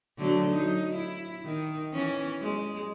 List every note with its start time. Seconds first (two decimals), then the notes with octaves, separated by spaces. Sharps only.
0.18 D3 F#3 A3
0.50 F#3 D#4
0.92 E4
1.45 D#3
1.93 E3 C#4
2.41 G#3